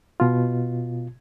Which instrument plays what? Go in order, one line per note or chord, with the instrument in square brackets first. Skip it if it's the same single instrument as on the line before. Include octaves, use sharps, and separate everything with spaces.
[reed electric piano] B2 F4